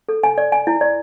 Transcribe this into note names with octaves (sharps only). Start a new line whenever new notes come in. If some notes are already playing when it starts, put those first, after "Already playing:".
A4
G#5
D5
G#5
E4
D5